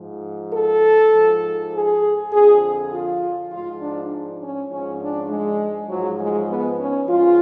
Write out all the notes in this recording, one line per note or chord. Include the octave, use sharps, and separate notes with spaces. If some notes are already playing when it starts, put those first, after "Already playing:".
Already playing: G#2 F3
A4
G#2 F3
G#4
F2 D3 F3 G#4
F4
G#2 F3 F4
D4
C#4
G#2 F3 C#4
D4
G#3
G#2 F3 F#3
G#3
B3
C#4
G#2 F3 F4